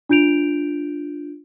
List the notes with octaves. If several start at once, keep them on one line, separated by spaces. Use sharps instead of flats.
D4 F4 G6 D7 F7